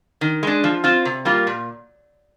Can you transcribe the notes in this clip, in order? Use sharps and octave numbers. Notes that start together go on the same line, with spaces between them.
D#3
G#3 D4
F3
C4 F4
C3
G3 A#3 F4
A#2